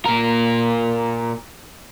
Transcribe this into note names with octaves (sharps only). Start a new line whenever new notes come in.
A#2 A#4